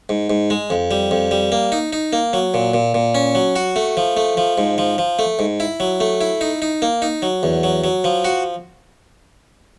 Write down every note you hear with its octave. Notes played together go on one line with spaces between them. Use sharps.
G#2
G#2
G#3
F2
G3
F2
G3
A#3
D#4
D#4
A#3
F#3
A#2
A#2
A#2
C#4
F#3
F#4
A3
F3
A3
F3
G#2
F3
F3
A3
G#2
E4
F#3
A3
E4
D#4
D#4
A#3
D#4
F#3
E2
F#3
F#3
F3
F#4